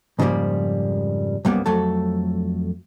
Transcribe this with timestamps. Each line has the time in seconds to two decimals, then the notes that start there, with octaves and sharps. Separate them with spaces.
0.19 F2 G#2 C#3 F3 G3 A#3
1.45 C2 F#2 G3 A#3 B3
1.66 F2 F#3 A3 A4